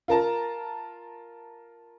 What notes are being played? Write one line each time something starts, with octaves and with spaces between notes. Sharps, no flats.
F4 A#4 A5 A#5